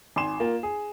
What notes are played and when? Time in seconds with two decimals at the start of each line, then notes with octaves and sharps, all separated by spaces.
0.16 G#1 G#5 C6 E7
0.40 A#3 F4
0.63 G#4